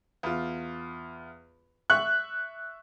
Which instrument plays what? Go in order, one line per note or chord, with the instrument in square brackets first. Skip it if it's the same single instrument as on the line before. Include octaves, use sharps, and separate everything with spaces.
[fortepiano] E2 F4
[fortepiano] E5 C#6 [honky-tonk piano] F#6